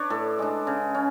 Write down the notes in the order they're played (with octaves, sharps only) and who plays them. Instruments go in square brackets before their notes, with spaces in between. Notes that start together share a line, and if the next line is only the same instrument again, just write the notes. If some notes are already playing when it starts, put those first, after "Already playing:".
Already playing: [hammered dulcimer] D4 B4 C#5
A2 A4
G#3 D4
C#3
C#4